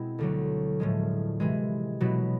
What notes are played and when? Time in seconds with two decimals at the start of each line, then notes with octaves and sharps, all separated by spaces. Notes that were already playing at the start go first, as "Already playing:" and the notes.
Already playing: B2 G#3 C4 E4
0.19 D2 D3 F#3
0.80 A2 F3 G#3
1.40 C3 E3 G#3
2.00 B2 F#3 B3 E4